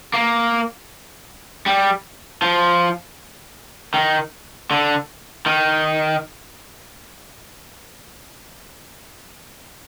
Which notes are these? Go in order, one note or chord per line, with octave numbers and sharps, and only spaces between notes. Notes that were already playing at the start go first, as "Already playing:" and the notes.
A#3
G3
F3
D#3
D3
D#3